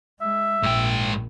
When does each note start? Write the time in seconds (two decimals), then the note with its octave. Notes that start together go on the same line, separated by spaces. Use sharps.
0.21 G#3 E5
0.63 A#1 G#2 G5